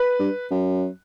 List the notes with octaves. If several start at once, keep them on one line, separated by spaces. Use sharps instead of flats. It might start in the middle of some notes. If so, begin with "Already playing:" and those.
Already playing: B4
G2
F#2